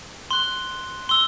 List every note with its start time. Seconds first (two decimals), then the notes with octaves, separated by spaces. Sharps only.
0.31 C6 F#6 G7
1.09 C6 E6 G7